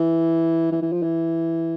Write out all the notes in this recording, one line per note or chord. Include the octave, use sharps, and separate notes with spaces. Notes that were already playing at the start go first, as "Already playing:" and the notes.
Already playing: E3
E3
E3
F3
E3